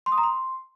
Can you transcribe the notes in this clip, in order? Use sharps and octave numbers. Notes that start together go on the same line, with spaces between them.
C6
D#6
A#5
C6